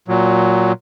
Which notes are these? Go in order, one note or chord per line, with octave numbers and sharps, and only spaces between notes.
A#2 F#3